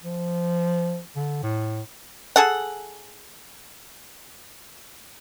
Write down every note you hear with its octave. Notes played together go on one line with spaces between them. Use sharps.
F3
D3
A2
G#4 A4 F#5